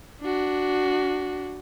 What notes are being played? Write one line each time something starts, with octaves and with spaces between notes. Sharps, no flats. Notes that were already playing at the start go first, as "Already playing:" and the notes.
D4 F#4